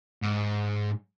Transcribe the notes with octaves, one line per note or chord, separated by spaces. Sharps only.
G#2